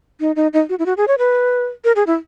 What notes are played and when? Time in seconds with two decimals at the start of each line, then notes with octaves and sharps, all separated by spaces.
0.20 D#4
0.36 D#4
0.53 D#4
0.69 F#4
0.79 E4
0.86 F#4
0.97 G#4
1.08 C#5
1.18 B4
1.84 A#4
1.96 G#4
2.07 E4